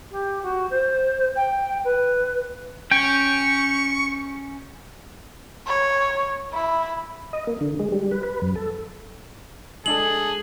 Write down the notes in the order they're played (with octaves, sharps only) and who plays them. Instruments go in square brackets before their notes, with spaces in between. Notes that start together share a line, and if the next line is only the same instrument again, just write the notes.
[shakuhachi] G4
F#4
C5
G5
B4
[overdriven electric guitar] C#4 [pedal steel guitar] G5 [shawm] C#6
[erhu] C#5
E4
[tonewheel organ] D#5
A#3
D3
G#3
G3
B4
B4
F#2
A4
[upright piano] G#3 D4 A4 [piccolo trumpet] G#4 [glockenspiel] F#7